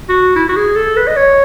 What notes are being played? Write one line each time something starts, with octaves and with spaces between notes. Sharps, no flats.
F#4
E4
F#4
G#4
A4
B4
D#5
C#5